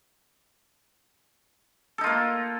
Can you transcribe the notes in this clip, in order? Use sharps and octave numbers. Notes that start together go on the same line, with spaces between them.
A#3 D#4 F4 A4